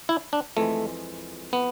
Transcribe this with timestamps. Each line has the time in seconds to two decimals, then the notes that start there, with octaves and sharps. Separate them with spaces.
0.09 E4
0.33 D4
0.57 F2 E3 G#3 A3
1.53 B3